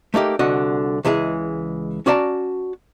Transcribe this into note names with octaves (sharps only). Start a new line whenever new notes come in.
A3 A#3 D#4 G4
C2 D3 F#4 D#5
C#2 E3 G#3 G#4
C#4 F#4 D5 E5 A5 A#5